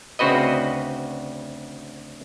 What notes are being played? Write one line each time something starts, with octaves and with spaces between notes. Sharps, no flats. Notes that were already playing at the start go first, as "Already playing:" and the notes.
D2 C#3 C4 F#4 B4 D#5